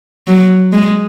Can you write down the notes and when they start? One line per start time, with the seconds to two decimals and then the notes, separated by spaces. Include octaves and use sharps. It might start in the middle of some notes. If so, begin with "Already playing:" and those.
0.27 F#3
0.73 G#3